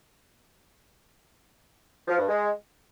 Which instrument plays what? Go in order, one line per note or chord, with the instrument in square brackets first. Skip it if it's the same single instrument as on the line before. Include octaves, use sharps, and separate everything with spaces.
[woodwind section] F3
G2
G#3